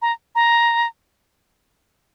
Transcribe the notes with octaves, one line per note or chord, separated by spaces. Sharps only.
A#5
A#5